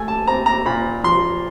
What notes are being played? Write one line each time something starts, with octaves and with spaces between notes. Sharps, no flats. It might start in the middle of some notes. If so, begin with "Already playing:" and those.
Already playing: A3 G#5
A5
C4 A#5
A#5
A#2 B5
F3 C6